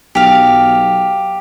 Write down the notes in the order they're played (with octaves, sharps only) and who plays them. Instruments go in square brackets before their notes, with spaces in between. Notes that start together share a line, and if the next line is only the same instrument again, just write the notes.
[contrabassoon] B1 [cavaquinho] G4 F5